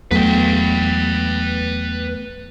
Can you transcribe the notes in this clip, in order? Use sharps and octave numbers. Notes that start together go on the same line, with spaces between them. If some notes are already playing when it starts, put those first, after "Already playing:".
E2 F#3 A3 B3 B4 G5